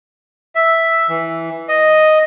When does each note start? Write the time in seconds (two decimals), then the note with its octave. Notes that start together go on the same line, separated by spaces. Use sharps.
0.55 E5
1.09 E3
1.69 D#5